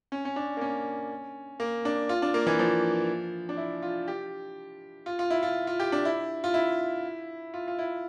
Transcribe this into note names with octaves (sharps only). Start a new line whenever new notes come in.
C#4
C#4
D4
A#3
C#4
A#3
D4
F4
D4
A#3
E3
F3
D4
E4
F4
G4
F4
F4
E4
F4
F4
G4
D4
E4
F4
E4
F4
F4
E4